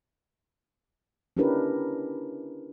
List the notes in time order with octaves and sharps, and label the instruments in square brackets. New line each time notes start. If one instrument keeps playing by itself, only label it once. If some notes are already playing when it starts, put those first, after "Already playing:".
[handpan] C#4 D4 E4 G4 A#4 B4